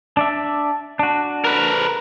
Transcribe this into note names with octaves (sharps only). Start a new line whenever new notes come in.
D4 D5 E5
D4 F#4
A#4 B4